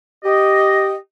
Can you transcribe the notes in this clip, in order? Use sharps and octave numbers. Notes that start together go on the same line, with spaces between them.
G4 D#5